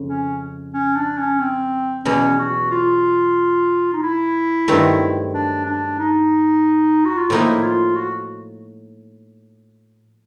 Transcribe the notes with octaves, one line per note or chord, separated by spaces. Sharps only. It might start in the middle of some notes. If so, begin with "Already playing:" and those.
Already playing: F2 C#3
C#4
C#4
D4
C#4
C4
E2 B2 F#3 C#4
F#4
F4
D#4
E4
G2 D#3 F#3 A3 C4
D4
D4
D#4
F#4
F4
A2 F3 A#3 D#4 E4
F4
F#4